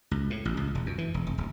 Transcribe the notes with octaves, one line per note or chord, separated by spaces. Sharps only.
C#2
A2
A1
C#2
E1
F#2
E3
E1
F1
D1